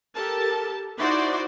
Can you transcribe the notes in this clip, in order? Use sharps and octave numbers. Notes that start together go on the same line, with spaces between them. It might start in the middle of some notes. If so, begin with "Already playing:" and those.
G4 A4 A#4 A5
D#4 E4 F#4 C5 D5 C6